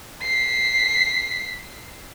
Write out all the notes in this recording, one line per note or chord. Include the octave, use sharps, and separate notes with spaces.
B6 C7